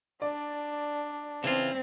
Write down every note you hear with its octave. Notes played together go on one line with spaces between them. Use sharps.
D4 D5
C#3 E3 C4 F4